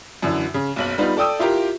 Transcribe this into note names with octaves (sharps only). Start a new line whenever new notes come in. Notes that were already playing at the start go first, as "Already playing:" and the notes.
F#2 D3 E3
C#3
F#1 B1 F#7
G3 B3 D#4 F4 B4
A4 D5 G5 D#6 E6
E4 F4 G4 A#4